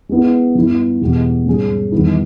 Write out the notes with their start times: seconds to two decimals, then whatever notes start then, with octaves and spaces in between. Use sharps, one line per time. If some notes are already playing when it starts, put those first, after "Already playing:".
0.09 G#3 B3 E4
0.55 G2 G3 B3 E4
1.01 E2 B2 G#3 B3 G4
1.46 G#2 G3 C#4 G#4
1.92 E2 D#3 G3 B3 E4